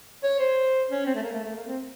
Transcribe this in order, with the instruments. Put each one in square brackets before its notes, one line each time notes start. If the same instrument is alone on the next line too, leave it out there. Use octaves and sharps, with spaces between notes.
[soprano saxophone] C#5
C5
C#4
C4
A3
A#3
A3
A3
A#3
C4